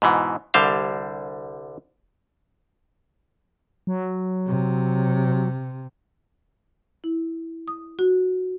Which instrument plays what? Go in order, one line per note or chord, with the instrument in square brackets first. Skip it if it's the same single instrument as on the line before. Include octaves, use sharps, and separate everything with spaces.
[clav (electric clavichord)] G#2 B2 E3
C2 D3 G3 C5 F5
[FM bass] F#3
[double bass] C3
[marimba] E4
D#6
F#4